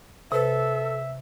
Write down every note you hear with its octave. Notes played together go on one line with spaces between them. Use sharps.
C3 A4 B4 E5